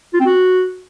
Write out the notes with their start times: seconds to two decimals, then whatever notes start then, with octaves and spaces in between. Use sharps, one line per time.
0.14 F4
0.20 C4
0.26 F#4